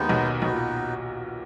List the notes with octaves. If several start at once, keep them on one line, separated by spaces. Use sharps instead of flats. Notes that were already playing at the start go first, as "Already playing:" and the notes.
Already playing: D#2 D#3 G#3 B3 D#4
B1 B2
B1 B2 B3 D#4 F#4 B4
A#2